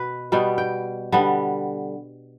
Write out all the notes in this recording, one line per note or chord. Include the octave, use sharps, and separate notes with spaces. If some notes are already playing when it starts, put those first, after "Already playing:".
Already playing: B2 B4
B2 G3 B3 G5
G5
D3 G3 B3